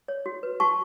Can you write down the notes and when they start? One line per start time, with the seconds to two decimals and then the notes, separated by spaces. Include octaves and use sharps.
0.08 C#5
0.26 F#4
0.43 B4
0.60 F#4 A5 C#6